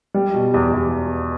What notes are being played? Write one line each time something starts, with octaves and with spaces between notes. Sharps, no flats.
G3
B2
E2
E2